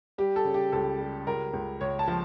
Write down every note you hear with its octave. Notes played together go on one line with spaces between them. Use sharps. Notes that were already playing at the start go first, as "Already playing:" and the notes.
G3 G4
A4
C#3
G4
C#2 A4
G3
C#2 A#4
C#2
C#2 C#5
A5
F3